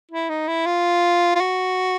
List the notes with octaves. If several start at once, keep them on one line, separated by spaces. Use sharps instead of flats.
E4
D#4
E4
F4
F4
F#4